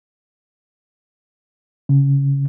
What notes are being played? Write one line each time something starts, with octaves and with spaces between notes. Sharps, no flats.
C#3